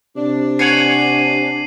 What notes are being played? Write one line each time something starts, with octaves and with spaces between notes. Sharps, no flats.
C3 D4
C#5 F#5 G#5 C7 D#7 F#7